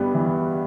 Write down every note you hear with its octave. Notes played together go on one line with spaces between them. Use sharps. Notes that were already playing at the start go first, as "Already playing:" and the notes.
Already playing: G2 G3 B3
E3